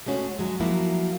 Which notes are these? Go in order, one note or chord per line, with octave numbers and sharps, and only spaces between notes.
G#3 A3 C#4 F#4
F#3 G#3
F3 F#3 A#3 E4 F#4